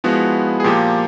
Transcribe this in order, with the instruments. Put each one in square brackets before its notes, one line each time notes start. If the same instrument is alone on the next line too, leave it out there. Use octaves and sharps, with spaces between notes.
[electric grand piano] F3 G#3 B3 E4 F#4
G#4
A#2 F3 A#3 G4